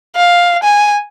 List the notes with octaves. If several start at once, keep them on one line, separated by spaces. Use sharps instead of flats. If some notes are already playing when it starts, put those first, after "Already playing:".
F5
G#5